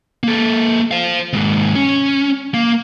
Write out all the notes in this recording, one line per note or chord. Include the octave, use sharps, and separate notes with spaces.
A#3 A4
C5 F5
D#2 G#2
C#4
A#3